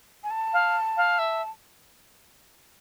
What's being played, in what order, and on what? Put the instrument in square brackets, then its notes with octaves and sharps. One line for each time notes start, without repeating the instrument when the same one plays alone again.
[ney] G#5
A5
[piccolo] F5
F5
E5